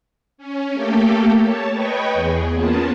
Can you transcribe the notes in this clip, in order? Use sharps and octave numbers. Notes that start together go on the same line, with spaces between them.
C#4
A3 A#3 G4 A4
C#5 A5
B4 C#5 D#5 G5 B5 C#6
E2 G#4
A#3 B3 C#4 F4 A5